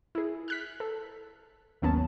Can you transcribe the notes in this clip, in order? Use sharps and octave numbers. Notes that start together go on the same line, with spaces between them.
E4 G#4
F6 F#6 B6
A4
G#1 D#2 F#3 B3 C#4 A5